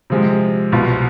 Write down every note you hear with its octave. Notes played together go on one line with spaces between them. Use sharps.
C3 F3 G#3
C2 B2 B3 F4